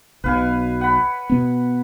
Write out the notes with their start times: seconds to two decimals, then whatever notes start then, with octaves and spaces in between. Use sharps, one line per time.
0.24 B1 B2 B4 F5 G#5
0.81 F#5 B5
1.30 B2 B3